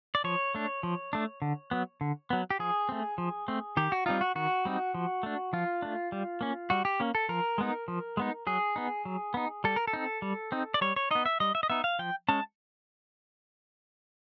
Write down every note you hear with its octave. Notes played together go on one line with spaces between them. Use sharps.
D5
F3 C#5
A3 D4
F3
A3 D4
D3
F#3 B3
D3
F#3 B3
G4
F3 G#4
A3 C4
F3
A3 C4
D#3 G4
F#4
G3 C4 D#4 F4
F#4
D#3 F#4
G3 C4 D#4
F3
A3 D4
F3 F4
A3 D4
G3
A#3 C#4
G3 F#4
G4
A#3 C#4
A4
F3 A#4
G#3 B3 D#4
F3
G#3 B3 D#4
F#3 G#4
B3 D#4
F#3
B3 D#4
G3 A4
A#4
A4
C4 D#4
G3
C4 D#4
D5
G3 C#5
C#5
B3 D#4 D#5
E5
G3 D#5
E5
D#5
B3 D#4 E5
F5
F3 G5
G#3 C#4 A5